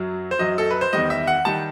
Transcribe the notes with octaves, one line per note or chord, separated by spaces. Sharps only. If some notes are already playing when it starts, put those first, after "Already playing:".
Already playing: F#2 F#3
C5
F#2 F#3 D#5
A4
B4
C5
E2 D#3 G3 D#5
E5
F#5
D#3 G3 A5